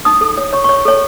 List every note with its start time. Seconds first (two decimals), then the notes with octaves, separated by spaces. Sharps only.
0.05 D#4 D#6
0.21 A4
0.37 C#5
0.53 C#5 C#6
0.64 C#5 C#6
0.85 A4 C#5